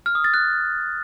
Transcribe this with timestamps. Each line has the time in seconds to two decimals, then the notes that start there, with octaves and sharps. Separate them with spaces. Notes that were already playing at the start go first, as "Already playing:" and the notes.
0.06 F6
0.15 D#6
0.24 A6
0.34 F#6